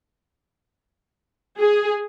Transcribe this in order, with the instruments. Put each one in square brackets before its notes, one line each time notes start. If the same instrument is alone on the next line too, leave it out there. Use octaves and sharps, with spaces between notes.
[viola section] G#4